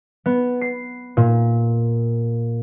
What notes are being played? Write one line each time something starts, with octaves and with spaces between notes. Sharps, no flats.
B3
C7
A#2